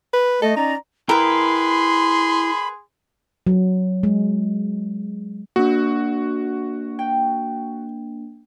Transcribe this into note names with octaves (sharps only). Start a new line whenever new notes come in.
B4
A3 A4 D#5
C#4 D#4 D5 A#5
E4 G#4 A#4 B4 G5 B5 C6
F#3
G#3
A#3 D4 F#4
G5